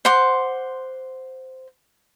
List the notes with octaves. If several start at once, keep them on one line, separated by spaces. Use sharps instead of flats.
C5 F#5 C6 D6